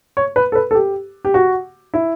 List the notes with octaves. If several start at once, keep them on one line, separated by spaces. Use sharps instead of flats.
C#5
B4
A4
B4
A4
G4
G4
F#4
E4